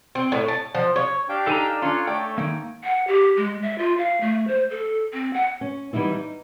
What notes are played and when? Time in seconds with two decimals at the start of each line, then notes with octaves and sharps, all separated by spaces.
0.15 C4
0.32 A2
0.48 A5
0.75 F3
0.96 C#5
1.29 D4 G4 F5 G5
1.47 D#4 A4 G#5 A#5
1.82 C#4 D4 F4 C#5
2.07 A3 D5 G5
2.38 G#2 D#3 A#3
2.84 F#5
3.08 G4
3.37 G#3
3.62 E5
3.78 F4
3.98 F5
4.21 A3
4.48 C5
4.70 A4
5.14 C4
5.34 F#5
5.61 C#4
5.93 E3 G3 B3 D#4 E4
6.12 D#4